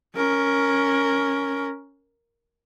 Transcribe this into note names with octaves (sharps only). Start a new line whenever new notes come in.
C#4 A#4